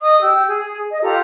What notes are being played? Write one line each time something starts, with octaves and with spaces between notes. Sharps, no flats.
D#5 D#6
G4 E6
G#4
D#5
F4 G4 A4 A#5